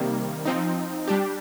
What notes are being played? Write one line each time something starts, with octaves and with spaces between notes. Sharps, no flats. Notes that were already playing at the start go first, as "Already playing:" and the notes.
Already playing: C3 D#3 G3 A#3
F3 C4 D#4
G3 D4 G4